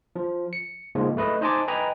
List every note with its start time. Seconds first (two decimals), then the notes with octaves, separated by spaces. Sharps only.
0.16 F3
0.53 C#7
0.95 C#2 G#2 F3 G#3 A#3
1.17 A3 B4 D#5
1.41 D#4 C5 D#5 G#5 A5 D6
1.68 B4 D#5 G5 G#5 A#5 B5